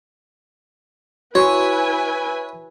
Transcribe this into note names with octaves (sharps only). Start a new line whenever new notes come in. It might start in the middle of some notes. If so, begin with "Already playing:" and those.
E4 F#4 B4 C#5 G#5